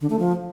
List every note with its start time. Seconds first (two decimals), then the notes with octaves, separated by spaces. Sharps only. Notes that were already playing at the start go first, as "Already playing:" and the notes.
0.01 D3
0.10 A3
0.19 F3